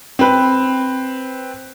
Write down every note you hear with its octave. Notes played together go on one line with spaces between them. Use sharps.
C4 B4